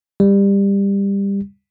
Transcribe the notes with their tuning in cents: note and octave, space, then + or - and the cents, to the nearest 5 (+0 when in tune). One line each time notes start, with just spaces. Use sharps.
G3 +20